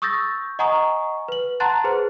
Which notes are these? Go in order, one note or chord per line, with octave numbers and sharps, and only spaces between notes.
C#6 D#6 E6 G6 A6 A#6
D#5 F#5 G#5 A#5 C#6 D#6
B4 F#7
F#5 A5 A#5 C6 F#6 A6
G#4 B4 C5